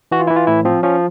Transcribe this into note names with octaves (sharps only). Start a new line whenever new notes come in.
E3 F#4
F4
E3 E4
F4
A2 E4
F3 C4
F3 C#4